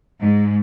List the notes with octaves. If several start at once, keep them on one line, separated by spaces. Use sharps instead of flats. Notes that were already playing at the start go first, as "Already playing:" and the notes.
G#2